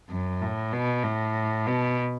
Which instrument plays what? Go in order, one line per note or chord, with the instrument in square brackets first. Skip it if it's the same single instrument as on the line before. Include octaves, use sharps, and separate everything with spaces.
[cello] F#2
A2
B2
A2
B2